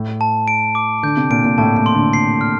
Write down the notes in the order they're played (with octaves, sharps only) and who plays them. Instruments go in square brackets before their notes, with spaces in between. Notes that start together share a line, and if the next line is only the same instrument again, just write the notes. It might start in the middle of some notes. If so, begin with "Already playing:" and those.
Already playing: [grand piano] A2
[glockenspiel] A5
D7
D6
[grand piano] D3 [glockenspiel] G6
[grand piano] C3
[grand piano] A#2 [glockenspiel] D7
[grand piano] A#2
[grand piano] A2 [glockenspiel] A5
[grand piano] A2
[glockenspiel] C6
[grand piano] D3
[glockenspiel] C7
F6